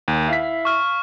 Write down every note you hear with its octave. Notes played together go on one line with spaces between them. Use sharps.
D#2
E4 F5 B6
C#6 F6